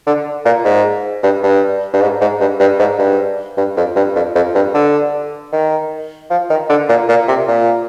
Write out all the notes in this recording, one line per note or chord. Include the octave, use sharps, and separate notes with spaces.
D3
A#2
G#2
G2
G2
G2
G#2
G#2
G2
G2
G#2
G2
G2
F2
G2
F2
F2
G2
D3
D#3
F3
D#3
D3
A#2
A#2
C3
A#2